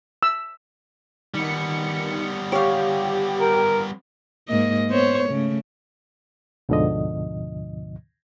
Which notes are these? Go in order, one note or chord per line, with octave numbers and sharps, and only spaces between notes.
E6
D#3 G3 B3 C#7
G4 C#5 F5
A#4
G#2 A#3 D#5
B3 C5 C#5
C#3 A3
D2 G#2 B2 D3 F3 D#5